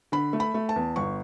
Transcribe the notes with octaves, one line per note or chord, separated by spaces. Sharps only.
D3 B5
A3
B5
A3
A5
E2
G1 C#6